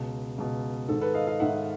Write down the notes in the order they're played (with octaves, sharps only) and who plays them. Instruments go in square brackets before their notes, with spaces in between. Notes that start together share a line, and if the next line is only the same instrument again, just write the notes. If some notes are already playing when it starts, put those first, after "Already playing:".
Already playing: [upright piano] C#2 B2
C#2 B2
G#2 D#3 A4
A4 B4
D#5 F5
D#5 F5
G#2 D#3 E5 F#5